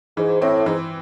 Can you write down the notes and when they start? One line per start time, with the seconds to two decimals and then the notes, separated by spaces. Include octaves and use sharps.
0.17 G#2 E3
0.41 A2 C4
0.66 G#2 E3